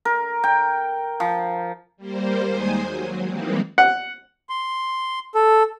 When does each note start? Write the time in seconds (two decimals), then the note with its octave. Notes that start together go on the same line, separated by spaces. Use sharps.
0.05 A#4
0.44 G5
1.20 F3
1.97 G3 A#3 C5
2.45 D#2 D#3 G#3 C5 G#5 D#6
2.81 F#3
3.27 E3 G3 G#3 A#3 C4 D#4
3.78 F#5
4.49 C6
5.35 A4